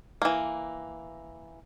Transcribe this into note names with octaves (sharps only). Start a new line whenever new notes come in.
E3 A#3